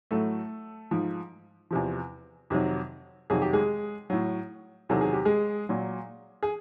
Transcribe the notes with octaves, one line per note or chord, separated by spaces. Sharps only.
A2 F#3 A3 A4
G#2 F3
E2 C3 F3
F2 C3 D#3 F#3
F2 C3 D#3 F#3 G#4
G4
G#3 G#4
A2 F#3
E2 C3 D#3 F#3 A4
G#4
G4
G#3 G#4
A#2 F#3
G#4